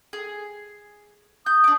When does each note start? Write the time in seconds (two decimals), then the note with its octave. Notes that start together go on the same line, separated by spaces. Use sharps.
0.13 G#4
1.46 D#6 G6
1.64 D4 D6